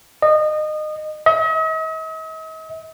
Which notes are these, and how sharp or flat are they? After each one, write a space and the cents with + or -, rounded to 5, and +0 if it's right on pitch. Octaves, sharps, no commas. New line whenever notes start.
D#5 -25
D#5 +45